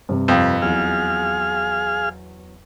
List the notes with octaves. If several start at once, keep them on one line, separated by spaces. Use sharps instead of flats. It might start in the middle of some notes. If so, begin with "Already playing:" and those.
G2 C3
F2 B4
E2 F#3 G#4 F5 F6